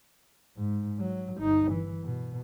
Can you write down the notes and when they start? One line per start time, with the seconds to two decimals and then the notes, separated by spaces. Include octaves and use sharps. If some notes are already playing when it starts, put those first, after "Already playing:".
0.57 G#2
0.99 F#3
1.40 G1 D#4
1.71 E3
2.04 B2